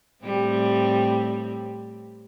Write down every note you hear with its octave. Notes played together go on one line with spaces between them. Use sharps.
A2 G3 C4